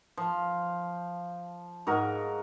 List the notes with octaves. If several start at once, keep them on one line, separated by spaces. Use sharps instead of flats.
F3
G#2 F#4 A#4